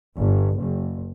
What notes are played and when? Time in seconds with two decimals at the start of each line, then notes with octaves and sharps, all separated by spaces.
0.19 G1
0.58 F#1